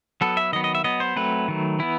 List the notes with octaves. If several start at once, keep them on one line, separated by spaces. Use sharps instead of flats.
F#3 B3 A4
E5
D#3 F#3 B3 D#5
D#5
E5
F#3 B3 D#5
C5
F#3 A3 C4 B4
D#3 F#3 A3
E3 B3 E4